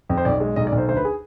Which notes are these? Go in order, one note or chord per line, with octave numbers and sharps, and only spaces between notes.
F2
C5
B1 D5
G#3
B1 D#5
D5
B1
C5
D2 C5
B4
G#4